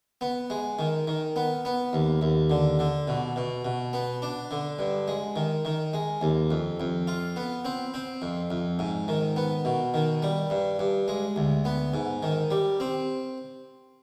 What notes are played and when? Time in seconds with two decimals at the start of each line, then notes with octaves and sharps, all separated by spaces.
0.21 B3
0.50 G#3
0.79 D#3
1.08 D#3
1.36 B3
1.65 B3
1.93 D#2
2.22 D#2
2.50 D3
2.79 D3
3.08 B2
3.36 B2
3.65 B2
3.93 B3
4.22 D4
4.51 D3
4.79 G2
5.08 G#3
5.36 D#3
5.65 D#3
5.93 G#3
6.21 D#2
6.51 F2
6.80 F2
7.07 F4
7.36 B3
7.65 C4
7.94 C4
8.22 F2
8.51 F2
8.79 G#2
9.08 D#3
9.36 B3
9.65 B2
9.94 D#3
10.22 G3
10.50 G2
10.79 G2
11.08 G#3
11.36 D2
11.65 B3
11.94 G#2
12.23 D#3
12.51 G3
12.80 C4